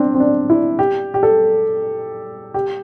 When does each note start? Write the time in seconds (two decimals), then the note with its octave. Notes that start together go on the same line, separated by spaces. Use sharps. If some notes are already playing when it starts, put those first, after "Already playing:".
Already playing: C4 D4
0.14 C4
0.20 D4
0.50 E4
0.79 G4
1.14 G4
1.23 A4
2.54 G4